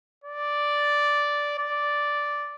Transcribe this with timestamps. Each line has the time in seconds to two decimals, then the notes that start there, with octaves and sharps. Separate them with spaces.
0.24 D5
1.58 D5